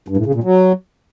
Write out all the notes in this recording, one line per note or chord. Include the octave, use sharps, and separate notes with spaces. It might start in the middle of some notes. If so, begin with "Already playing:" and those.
G2
A2
C#3
A#2
F#3